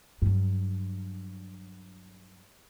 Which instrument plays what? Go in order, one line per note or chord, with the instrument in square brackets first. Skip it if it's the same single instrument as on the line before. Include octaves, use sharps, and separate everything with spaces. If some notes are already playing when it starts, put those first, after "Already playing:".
[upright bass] G2 F#3